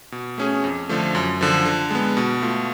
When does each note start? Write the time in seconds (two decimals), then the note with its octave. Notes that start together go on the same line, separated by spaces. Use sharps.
0.12 B2
0.38 A3 C#4 G#4
0.64 F2
0.89 D3 F3 A3
1.15 F#2
1.41 D3 F3
1.65 D3
1.91 G#3 B3
2.17 B2
2.42 A3 F4